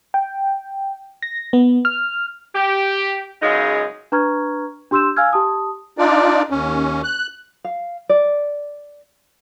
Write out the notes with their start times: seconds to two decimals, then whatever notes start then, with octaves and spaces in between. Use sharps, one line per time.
0.14 G5
1.22 A#6
1.53 B3
1.85 F6
2.55 G4
3.42 F#2 C#3 G#3 D#4 F4 G#4
4.12 D4 B4 A#5 C#6 F6 G#6
4.91 D4 G4 C6 E6 G6 E7
5.16 F5 G#5 E6 F6 G#6
5.33 G4 A5 D#6
5.98 D4 D#4 F4 D5
6.50 D#2 C#4
7.04 F#6
7.64 F5
8.09 D5